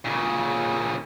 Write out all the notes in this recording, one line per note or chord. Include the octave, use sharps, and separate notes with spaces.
A#2 C#3